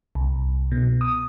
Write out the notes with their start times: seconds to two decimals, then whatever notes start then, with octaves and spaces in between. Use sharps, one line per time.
0.15 C2
0.72 B2
1.01 D#6